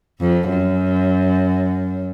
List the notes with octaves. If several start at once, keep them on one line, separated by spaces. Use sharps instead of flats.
F2
F#2